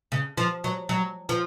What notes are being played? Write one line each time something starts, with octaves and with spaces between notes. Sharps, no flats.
C#3
F3
F#3
F#3
F3